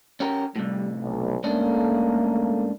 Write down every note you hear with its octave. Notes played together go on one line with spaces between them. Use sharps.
C#4 G4 A#4
A2 C3 G3
B1
G#2 A3 A#3 C#4 D4